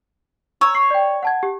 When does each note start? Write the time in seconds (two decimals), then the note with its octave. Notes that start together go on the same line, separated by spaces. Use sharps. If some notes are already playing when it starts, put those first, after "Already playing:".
0.61 C#5 A#5 E6
0.74 C#6 C7
0.91 D5 G5
1.23 F#5 A5 G#6
1.43 G4